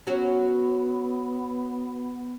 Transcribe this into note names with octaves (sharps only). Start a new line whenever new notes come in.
F#3 B3 C#4 F#4